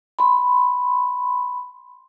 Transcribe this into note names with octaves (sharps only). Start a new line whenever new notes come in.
B5 C6